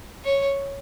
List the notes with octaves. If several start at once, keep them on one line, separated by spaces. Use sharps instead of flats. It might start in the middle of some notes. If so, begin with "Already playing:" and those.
C#5